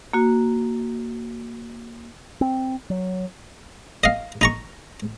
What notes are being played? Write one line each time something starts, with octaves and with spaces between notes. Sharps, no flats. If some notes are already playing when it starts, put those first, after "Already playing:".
A#3 F#4
C4
F#3
D#5 F5
D#4 A#5 C#6